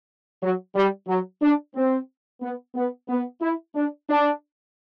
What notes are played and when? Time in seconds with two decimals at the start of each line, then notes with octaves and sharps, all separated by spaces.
0.42 F#3
0.76 G3
1.08 F#3
1.42 D4
1.75 C4
2.42 B3
2.75 B3
3.09 B3
3.42 E4
3.75 D4
4.09 D4